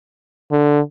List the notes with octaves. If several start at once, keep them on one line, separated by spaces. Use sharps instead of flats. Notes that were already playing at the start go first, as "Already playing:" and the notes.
D3